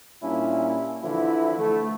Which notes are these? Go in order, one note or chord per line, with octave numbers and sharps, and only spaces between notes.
A#2 G3 C#4 D4 E4
D3 E3 F3 E4
A3